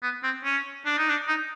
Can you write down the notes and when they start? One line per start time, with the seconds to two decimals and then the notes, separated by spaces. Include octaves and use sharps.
0.03 B3
0.23 C4
0.44 C#4
0.86 D4
0.98 D#4
1.10 D4
1.28 D#4